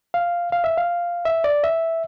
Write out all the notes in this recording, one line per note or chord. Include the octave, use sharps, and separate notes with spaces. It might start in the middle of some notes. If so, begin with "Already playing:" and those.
F5
F5
E5
F5
E5
D5
E5